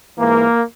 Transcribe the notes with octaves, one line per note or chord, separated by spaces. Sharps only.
G#2 E3 A#3